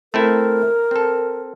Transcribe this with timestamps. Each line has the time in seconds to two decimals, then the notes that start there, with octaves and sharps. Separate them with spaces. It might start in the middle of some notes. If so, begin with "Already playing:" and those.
0.14 A3 C4 E4 A#4
0.91 C4 A4